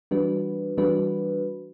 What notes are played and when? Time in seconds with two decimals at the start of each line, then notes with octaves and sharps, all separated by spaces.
0.11 E3 G3 D4 F#4 B4
0.77 E3 G3 D4 F#4 B4